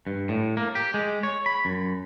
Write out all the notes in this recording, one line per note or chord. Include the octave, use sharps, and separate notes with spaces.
G2
A2
A#3
G4
G#3
C#5
B5
F#2